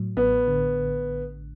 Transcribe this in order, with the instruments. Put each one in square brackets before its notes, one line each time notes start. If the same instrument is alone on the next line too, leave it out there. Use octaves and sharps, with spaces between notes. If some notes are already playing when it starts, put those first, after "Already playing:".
Already playing: [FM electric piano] A2 F#3
[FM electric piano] A1 [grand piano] B3
[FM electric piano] D3